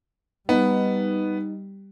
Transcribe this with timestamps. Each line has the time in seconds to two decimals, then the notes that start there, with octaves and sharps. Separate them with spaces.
0.49 G3 B3 D#4